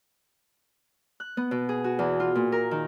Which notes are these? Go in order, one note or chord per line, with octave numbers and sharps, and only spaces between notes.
F#6
B3
B2
G#4
F#4
E2
F4
A#2
A#4
D#3